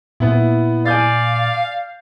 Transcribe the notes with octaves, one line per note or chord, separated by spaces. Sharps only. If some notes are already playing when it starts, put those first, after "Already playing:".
A#2 B3 E4
D5 F5 G#5 G6 A6